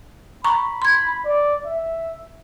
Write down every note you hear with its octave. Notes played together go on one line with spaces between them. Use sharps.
A#5 B5 C#6
C6 G#6
D5
E5